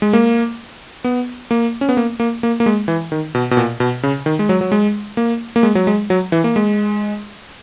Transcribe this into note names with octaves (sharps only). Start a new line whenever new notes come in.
G#3
A#3
B3
A#3
C#4
B3
A#3
A#3
A#3
A#3
G#3
E3
D#3
B2
B2
A#2
B2
C#3
D#3
G#3
F#3
F#3
G#3
A#3
A#3
G#3
F#3
G#3
F#3
E3
A#3
G#3